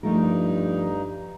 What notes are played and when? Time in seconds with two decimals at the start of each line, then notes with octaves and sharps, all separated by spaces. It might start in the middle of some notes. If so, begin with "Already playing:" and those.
0.03 G2 F3 A3 D#4 A#4